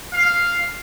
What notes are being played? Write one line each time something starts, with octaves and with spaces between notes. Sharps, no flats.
F5